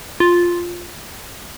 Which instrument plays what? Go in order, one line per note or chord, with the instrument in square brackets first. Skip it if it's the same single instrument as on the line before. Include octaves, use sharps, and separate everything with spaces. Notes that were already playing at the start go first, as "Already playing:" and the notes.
[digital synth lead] F4